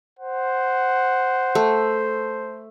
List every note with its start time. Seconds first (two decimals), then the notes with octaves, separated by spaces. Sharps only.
0.19 C5 F#5
1.55 A3